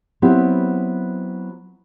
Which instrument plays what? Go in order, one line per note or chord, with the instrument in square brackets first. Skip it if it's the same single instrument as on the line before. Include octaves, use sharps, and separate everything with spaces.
[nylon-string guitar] F#3 B3 C4 E4 G4